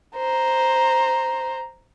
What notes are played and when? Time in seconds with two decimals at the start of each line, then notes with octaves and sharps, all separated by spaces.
0.16 C5 A#5